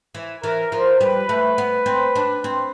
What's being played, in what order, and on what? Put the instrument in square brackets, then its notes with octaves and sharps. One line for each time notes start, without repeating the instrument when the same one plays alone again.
[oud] E3
[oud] E3 [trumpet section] A#4
[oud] F3 [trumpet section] A#4
[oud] G3 [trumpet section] B4
[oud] A3
B3
C4
D4
C4